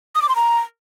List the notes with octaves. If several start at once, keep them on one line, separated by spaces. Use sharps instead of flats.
D#6
D6
C6
A#5